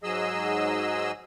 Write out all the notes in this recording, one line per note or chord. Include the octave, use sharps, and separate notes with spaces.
G#2 F#3 G#4 D#5 E6